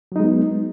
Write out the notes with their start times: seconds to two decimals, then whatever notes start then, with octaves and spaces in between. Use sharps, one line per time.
0.12 F#3
0.16 D#4
0.20 G#3
0.24 B3